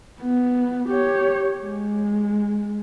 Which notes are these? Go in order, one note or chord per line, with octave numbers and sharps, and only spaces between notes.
B3
G4 C#5
G#3